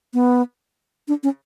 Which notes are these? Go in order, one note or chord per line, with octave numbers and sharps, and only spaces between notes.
B3
D4
C#4